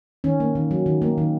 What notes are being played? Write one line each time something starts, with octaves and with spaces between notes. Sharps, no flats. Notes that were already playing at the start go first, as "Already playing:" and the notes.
D#3 C#4
A#3
D#3
F#3
D#3
A#3
D#3